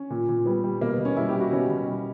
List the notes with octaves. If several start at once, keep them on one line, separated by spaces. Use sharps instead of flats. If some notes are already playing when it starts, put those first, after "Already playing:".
Already playing: C#4
A#2
A#2
G3 B3
G3
B2 A#3
B3
B2
C#4
G3 E4
G4
G3
F#4
B2 C#4
B2
G3